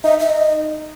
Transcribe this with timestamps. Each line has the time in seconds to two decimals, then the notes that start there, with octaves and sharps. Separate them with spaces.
0.04 D#4 E5
0.19 E5
0.30 D#5